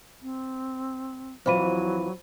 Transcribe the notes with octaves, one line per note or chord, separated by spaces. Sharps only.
C4
F2 E3 F#3 C5 B5 D#7